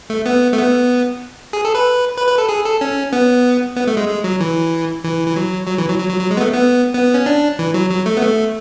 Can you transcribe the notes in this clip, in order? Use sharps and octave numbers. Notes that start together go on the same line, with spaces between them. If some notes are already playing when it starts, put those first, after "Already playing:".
A3
B3
A3
B3
G#4
A4
B4
B4
B4
A4
G#4
A4
C#4
B3
B3
A3
G#3
G#3
F#3
E3
E3
E3
F#3
F#3
E3
F#3
F#3
F#3
F#3
G#3
B3
A3
B3
B3
C#4
D4
E3
F#3
F#3
A3
B3
A3